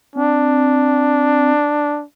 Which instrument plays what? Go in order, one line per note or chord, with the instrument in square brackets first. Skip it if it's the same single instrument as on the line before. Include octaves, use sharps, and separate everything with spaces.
[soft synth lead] C4 [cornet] D4